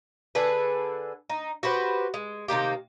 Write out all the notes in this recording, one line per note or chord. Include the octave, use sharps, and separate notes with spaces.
D3 G#4 A4 B4
D#4
F#4 G4 B4 C5
G#3
C3 D#3 A#3 G4